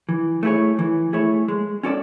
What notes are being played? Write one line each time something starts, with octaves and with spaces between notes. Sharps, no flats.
E3
A3 E4 G#4 C#5
E3
A3 E4 G#4 C#5
G#3
C#4 F#4 A4 D5